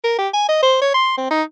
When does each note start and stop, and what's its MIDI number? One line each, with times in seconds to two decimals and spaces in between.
0.04 0.17 70
0.19 0.29 67
0.34 0.46 80
0.49 0.59 75
0.62 0.77 72
0.82 0.93 73
0.94 1.13 84
1.18 1.27 60
1.31 1.43 63